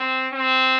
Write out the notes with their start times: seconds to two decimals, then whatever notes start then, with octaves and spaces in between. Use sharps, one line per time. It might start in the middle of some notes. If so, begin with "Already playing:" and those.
Already playing: C4
0.33 C4